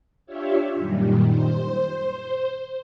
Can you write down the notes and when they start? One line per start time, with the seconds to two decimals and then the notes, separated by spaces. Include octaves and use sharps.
0.26 D4 F4 G4 C#5 E5
0.74 F#2 A#2 D#3 G3
1.23 C5